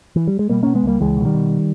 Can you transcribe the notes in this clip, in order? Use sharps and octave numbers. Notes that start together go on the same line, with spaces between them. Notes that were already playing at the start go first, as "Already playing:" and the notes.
E3
G3
G#3
B2 G3 A#3
B2 A#3 C#4
G#3 B3
C#2 G3 A#3
C#2 E3 G#3
B2 E3
D#3 G3
B2